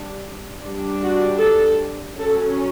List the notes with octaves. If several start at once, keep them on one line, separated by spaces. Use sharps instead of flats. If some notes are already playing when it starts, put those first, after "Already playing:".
Already playing: G3 D4
G3 D4
F#4
A4
F#3 C#4 A4